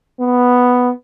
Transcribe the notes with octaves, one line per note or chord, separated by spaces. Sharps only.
B3